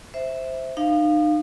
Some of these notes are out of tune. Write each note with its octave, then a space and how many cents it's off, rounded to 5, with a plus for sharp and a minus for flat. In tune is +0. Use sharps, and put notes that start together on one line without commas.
C5 +0 E5 -5
D#4 -35 F5 +0